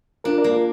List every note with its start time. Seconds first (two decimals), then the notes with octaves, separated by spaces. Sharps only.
0.24 D4 F4 A#4
0.38 A#4 D5
0.44 A#3
0.51 F4 A#4